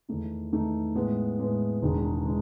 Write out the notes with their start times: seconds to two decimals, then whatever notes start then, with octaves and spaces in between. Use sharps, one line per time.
0.09 E2 D#3 A3 D#4
0.52 E2 D#3 A3 D#4
0.95 A2 G#3 B3
1.39 A2 G#3 B3
1.82 E1 E2 D#3 G#3
2.25 D#3 G#3